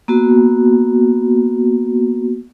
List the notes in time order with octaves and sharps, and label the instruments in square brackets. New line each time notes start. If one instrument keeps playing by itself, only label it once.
[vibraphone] A#3 B3 F#4